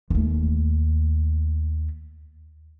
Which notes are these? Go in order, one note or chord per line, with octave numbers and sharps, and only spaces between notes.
D#2 A3